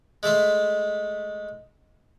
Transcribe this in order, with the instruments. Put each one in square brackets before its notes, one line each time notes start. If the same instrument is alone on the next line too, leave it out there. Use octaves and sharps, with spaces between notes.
[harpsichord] G#3 A3 E5 C6